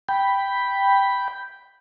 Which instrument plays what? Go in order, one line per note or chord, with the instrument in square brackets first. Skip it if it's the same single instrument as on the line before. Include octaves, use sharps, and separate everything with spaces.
[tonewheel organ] G5 B5